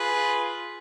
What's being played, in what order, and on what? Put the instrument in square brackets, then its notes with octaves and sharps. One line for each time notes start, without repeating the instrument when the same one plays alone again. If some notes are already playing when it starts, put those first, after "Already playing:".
Already playing: [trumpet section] F4 G#4 B4